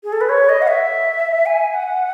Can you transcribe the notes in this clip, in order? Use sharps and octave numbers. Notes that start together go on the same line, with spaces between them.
G#4
A4
B4
C#5
D#5
F#5
E5
G#5
F#5